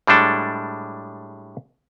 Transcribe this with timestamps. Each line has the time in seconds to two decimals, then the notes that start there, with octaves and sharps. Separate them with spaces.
0.07 A2 G3 G#3 D4 A4